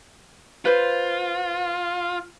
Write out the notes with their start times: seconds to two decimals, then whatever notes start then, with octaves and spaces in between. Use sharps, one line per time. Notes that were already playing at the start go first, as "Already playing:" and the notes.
0.65 F4 B4 C5